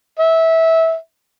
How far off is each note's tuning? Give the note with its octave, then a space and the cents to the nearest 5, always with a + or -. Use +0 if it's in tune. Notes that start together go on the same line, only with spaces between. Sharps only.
E5 -20